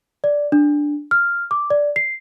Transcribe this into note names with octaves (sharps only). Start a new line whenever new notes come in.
D5
D4
F6
D6
D5
C7